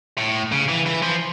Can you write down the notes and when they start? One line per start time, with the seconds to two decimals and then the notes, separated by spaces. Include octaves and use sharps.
0.18 A2
0.52 C#3
0.69 E3
0.86 E3
1.02 F3